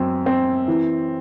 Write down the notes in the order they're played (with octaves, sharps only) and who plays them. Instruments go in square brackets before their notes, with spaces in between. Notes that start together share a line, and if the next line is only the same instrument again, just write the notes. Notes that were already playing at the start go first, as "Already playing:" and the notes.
Already playing: [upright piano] F#2 C4
C4
E3